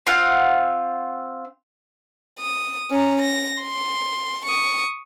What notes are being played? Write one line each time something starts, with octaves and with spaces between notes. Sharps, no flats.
C4 F4 F5 F#5
D#6
C#4 A#5
A#6
C6
C#6 D#6